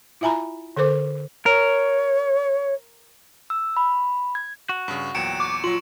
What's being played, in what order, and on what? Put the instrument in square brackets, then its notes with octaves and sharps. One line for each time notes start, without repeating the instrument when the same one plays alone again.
[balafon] E4 F4 E5 G#5 A#5 B5
D3 A4 A#4 C5 D6
[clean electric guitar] A#4 [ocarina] C#5
[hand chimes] E6
B5
G#6
[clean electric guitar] F#4
[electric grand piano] G2 C#3
[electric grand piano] E2 A#2 F#3 [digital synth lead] G5 [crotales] C#7 D7 E7
[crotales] C#6 [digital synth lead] D6
[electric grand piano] A#1 F#3 [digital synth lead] F4 [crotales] F#7